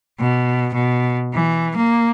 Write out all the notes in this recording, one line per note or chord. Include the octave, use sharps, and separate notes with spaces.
B2
B2
E3
A#3